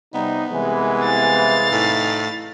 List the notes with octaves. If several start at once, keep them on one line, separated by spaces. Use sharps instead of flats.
C3 G3 B3 D#4
C2 C3 E3 G#3
F5 A6
A2 D#4